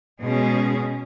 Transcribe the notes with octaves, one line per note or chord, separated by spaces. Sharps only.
B2 G#3 C#4 G#4